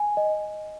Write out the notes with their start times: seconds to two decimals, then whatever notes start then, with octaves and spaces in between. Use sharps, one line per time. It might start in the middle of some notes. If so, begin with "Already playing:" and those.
Already playing: G#5
0.17 D#5